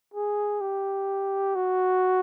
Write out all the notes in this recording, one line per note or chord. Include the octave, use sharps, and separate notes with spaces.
G#4
G4
F#4